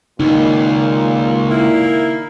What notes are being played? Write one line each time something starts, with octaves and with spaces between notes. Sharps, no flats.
C#2 A#2 D#4
A#3 E4